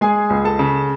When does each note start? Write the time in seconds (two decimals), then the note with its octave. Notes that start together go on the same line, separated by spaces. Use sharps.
0.01 G#3 G#4 G#5
0.30 C#2
0.45 A4 A5
0.59 C#3